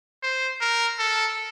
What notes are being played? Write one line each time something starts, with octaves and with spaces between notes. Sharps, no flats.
C5
A#4
A4